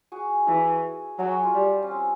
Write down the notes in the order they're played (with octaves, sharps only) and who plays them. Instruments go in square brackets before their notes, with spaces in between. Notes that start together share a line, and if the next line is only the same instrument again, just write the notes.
[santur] F#4 G#4
[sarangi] E3 [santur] F#4 G#4
[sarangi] F#3 [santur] F#4 G#4
[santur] F4 G4
[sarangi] G3
[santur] C#4
C4